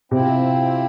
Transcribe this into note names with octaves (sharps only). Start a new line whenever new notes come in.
C3 F3 C4 E4